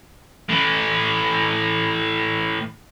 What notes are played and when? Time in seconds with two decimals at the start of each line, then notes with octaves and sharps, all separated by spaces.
0.49 A2 E3